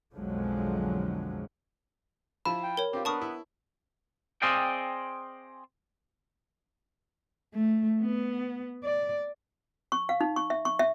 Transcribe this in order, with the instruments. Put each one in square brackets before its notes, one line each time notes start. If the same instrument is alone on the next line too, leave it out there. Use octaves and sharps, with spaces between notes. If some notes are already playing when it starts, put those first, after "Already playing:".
[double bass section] B1 F2 D3 F3 F#3 G#3
[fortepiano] F3 E4 F4 [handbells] B5
[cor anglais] G5
[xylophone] A#4 C#5
[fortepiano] C4 F4 [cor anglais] G4
[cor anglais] B3 [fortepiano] D4 A#4 [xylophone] A5 C#6 D#6
[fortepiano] E4
[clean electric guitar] C4 G#4 D5 D#5 F5 G5
[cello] A3
B3
D5
[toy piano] C#6
F5
D#4
C#6
E5
C#6
E5